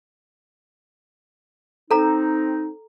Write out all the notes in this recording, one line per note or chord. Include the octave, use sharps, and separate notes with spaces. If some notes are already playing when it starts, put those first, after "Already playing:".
C4 D#4 A4 A#5